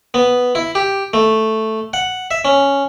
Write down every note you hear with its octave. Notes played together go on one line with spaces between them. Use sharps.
B3
E4
G4
A3
F#5
E5
C#4